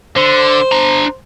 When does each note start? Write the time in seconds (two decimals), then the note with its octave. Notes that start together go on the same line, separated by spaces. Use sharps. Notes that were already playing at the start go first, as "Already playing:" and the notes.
0.17 D3 C5
0.72 D4 A#5